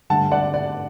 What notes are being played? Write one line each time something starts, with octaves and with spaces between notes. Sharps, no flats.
G2 D3 A3 F#5 A5
D5 F#5
D5